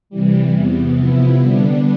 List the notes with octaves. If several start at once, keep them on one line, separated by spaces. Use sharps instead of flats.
C3 E3 G3
E2 C3 E3 B3
C3 F3 B3 E4
D3 G3 B3 D4